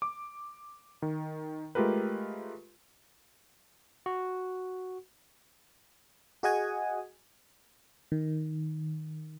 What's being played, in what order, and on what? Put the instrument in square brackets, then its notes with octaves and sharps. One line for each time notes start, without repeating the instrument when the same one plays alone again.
[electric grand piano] D6
D#3
G#3 A3 F4 G4 A#4 B4
[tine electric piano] F#4
[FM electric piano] F#4 G#4 D#5 F#5 G#5
D#3